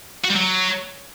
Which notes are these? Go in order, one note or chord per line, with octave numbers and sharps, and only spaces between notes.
F#4
G3
F#3